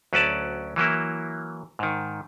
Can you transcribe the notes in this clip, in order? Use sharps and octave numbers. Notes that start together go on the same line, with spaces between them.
D2 F#3 C#4 B4 D5 A5
E3 F#3 A#3 E4
G#2 D#3